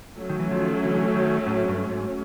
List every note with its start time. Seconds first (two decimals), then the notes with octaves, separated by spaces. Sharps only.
0.18 F#3 A3 C#4
0.29 D#3
0.40 E3
0.51 D#3 F3
0.83 D3 E3
1.14 D#3
1.47 A2
1.69 G2
1.89 G#2